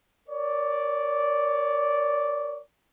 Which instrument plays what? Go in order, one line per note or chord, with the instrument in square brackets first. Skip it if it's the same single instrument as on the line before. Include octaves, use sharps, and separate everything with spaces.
[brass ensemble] A#4 C#5 D5